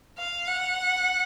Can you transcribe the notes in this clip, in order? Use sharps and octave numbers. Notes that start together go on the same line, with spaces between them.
F5
F#5